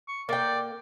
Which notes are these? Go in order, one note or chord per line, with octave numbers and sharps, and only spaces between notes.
C#6
A#3 D5 G5